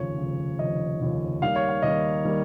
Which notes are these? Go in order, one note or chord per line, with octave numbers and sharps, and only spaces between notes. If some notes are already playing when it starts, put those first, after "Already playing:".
Already playing: F1 D#2 C#3 F3 C#5
F1 D#2 C#3 F3
F1 D#2 C#3 F3 D#5
F1 D#2 C#3 F3
D#2 D#3 G3 A#3 F5
C#5
F5
D#2 D#3 G3 A#3 D#5
D#3 G3 A#3